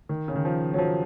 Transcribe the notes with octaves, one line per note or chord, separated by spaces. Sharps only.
D#3
C#3
D#3
F3
F#3
F3